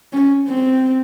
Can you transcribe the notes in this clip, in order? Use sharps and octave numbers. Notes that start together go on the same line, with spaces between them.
C#4
C4